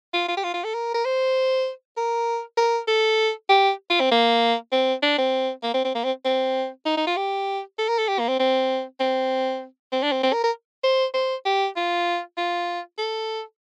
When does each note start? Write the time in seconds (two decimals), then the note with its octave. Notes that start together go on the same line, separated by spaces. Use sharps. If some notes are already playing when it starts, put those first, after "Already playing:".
0.14 F4
0.28 F4
0.37 G4
0.44 F4
0.54 F4
0.64 A4
0.74 A#4
0.94 A#4
1.05 C5
1.97 A#4
2.58 A#4
2.88 A4
3.49 G4
3.90 F4
4.00 C4
4.12 A#3
4.72 C4
5.03 D4
5.18 C4
5.63 A#3
5.74 C4
5.85 C4
5.95 A#3
6.04 C4
6.25 C4
6.86 D#4
6.97 D#4
7.07 F4
7.17 G4
7.79 A4
7.88 A#4
7.99 A4
8.08 G4
8.19 A#3
8.29 C4
8.40 C4
9.00 C4
9.92 C4
10.03 D4
10.12 C4
10.23 C4
10.33 A#4
10.44 A#4
10.84 C5
11.14 C5
11.45 G4
11.77 F4
12.38 F4
12.99 A4